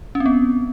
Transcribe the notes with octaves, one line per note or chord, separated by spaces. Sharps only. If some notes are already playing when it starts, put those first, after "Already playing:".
C#4
C4
B3